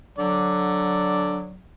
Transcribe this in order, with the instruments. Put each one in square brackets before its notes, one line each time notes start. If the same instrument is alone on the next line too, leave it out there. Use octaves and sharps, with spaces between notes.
[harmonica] D3 D5 [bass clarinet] F#3